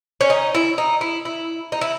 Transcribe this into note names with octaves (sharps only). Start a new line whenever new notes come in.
C#4
D#4
E4
D#4
E4
E4
D#4
E4